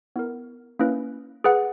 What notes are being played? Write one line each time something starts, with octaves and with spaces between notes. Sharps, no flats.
B3 E4 A#4
A#3 C#4 E4 B4
G#4 B4 F#5